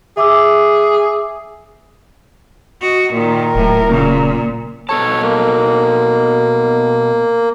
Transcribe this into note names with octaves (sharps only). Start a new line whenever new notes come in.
G#4 E5 D6 E6
F#4 D#5
A#2 D#3 A#4
D#1 A2 F#3
A#2 C#3 A#3
B2 A4 C#5 A5
A#3